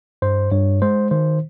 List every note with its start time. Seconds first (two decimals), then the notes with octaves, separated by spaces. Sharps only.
0.22 G2 C5
0.52 G2 C#5
0.82 G#3 C5
1.11 D#3 C5